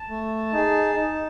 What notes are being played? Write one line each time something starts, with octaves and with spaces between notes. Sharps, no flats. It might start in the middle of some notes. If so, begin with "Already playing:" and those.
Already playing: A5
A3
D#4 G#4
D#4